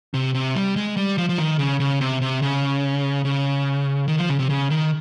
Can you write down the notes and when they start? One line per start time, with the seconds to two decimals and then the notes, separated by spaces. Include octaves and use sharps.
0.14 C3
0.34 C3
0.55 G3
0.76 G#3
0.97 G3
1.18 F3
1.29 F3
1.38 D#3
1.59 C#3
1.80 C#3
2.01 C3
2.22 C3
2.42 C#3
3.25 C#3
4.08 D#3
4.18 F3
4.29 C#3
4.39 C3
4.49 C#3
4.70 D#3